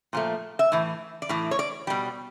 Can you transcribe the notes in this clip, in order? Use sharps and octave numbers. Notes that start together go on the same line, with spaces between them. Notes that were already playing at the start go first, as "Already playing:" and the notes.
A#2 F3 A3
E5
A2 E3
D5
A2 E3
C#5
D5
B2 G3